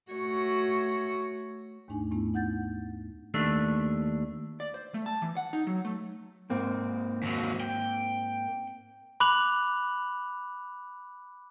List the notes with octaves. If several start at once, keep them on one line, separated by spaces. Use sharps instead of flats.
A3 F#4 C#5
D#2 G#2 A3 D4 D#4 G#5
G#2 A3 B3 D4 E4
D#4 F#5 G6 A6
D#2 A3 D4
D5
C5
A3
A5
E3
F#5
D#4
F#3
A3
G#2 A#3 C4
D#2 F#3
G5
B5 D6 F#6 F7 F#7